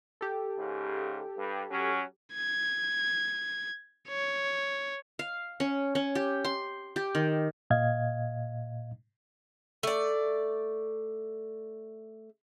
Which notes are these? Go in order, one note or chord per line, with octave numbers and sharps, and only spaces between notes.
G4 A4
G#2 C#3
G2
F#3 C#4
G#6
C#5
F5
C#4
C#4
G4
C6
G4
D#3
A#2 D#5 F5 G#6
A3 D5